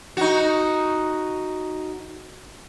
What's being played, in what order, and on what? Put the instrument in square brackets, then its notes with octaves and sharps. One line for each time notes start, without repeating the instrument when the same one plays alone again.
[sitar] D#4 F#4